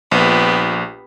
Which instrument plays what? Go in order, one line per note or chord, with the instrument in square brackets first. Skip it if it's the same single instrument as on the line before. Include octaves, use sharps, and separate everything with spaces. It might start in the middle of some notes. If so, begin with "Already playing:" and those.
[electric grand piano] A#1 [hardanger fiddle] B3 G4